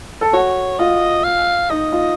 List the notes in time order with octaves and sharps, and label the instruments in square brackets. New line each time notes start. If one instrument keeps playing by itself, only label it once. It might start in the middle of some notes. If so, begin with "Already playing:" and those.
[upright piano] A4
[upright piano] F#4 [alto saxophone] C#5
[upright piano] F4 [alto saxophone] D#5
[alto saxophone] F5
[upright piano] D#4 [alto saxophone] D#5
[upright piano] F4